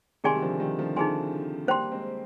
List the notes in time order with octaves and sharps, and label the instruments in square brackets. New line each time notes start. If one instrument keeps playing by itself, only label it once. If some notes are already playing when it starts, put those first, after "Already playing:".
[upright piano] C3 D#3 [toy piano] D#4 G#4 D5 G#5 C6
[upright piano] G3
D3 F3
D#3 G3
D3 F3
[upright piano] D3 F3 [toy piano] D#4 G#4 D5 G#5 C6
[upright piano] G3 A#3 [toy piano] C5 G5 C6
[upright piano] G#3 C4